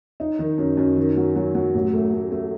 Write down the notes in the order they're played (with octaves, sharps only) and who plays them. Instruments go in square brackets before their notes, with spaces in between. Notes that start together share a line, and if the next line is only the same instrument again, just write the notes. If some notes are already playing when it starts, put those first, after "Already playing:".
[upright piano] D#4
D#3
F#2
F#2
D#3
F#3
F#3
F#3
A1
A3
A3
A3